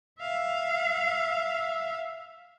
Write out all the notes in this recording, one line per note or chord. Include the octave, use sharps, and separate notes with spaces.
E5 F5